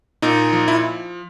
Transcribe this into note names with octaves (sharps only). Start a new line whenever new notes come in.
A#2 D#4
F3
E4